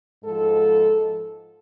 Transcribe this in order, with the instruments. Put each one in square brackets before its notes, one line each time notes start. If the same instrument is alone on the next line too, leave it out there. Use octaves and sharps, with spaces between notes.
[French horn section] G#2 F3 G#3 A4